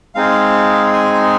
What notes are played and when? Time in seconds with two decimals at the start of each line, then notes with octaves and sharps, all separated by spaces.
0.15 G#3 C4 D#4 G#4 F5
0.93 G#5